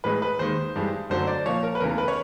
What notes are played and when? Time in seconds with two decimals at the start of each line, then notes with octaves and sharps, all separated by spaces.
0.04 A2 E3 G#3 B4
0.22 B4
0.39 D#2 D#3 G#3 C5
0.76 G2 E3 G#3
1.10 F#2 D3 F#3 A3 C5
1.27 D5
1.46 A#2 F3 A#3 C#5
1.63 A#4
1.75 B4
1.80 E2 C#3 E3 A3 A#4
1.98 B4
2.08 C#5